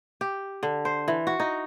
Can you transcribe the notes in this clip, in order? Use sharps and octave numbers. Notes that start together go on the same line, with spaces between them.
G4
D3
C5
E3
F#4
D#4